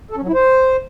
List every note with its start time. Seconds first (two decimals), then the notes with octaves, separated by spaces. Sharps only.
0.11 A4
0.17 C#4
0.22 F#3
0.28 E4
0.34 C5